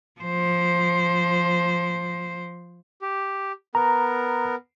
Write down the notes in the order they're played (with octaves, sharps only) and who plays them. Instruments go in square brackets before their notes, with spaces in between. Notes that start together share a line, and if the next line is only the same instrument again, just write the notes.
[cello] F3 C5
[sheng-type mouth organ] G4
[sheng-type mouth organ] B3 A#4 [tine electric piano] A#5